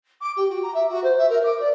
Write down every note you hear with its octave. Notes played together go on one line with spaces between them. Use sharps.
D6
G4
F#4
A#5
E5
F#4
C5
E5
A#4
D6
D5